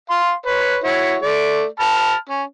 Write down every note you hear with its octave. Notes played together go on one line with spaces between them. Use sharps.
F5 C6
B4 C#5
E4 F#4 C#5
A3 D5
A5 B5 F6
C#4